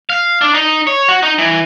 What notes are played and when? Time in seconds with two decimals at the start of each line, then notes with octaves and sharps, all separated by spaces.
0.10 F5
0.41 D4
0.55 D#4
0.87 C#5
1.08 F#4
1.23 D#4
1.38 E3